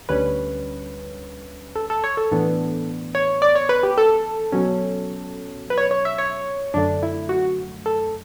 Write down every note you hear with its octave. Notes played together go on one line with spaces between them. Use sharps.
D2 D3 G3 C#4 B4
A4
A4
C#5
A4
A2 E3 B3 D4
C#5
D5
C#5
B4
G4
A4
B2 F#3 C#4
B4
C#5
C#5
E5
C#5
F#2 D3 A3 D4
E4
F#4
A4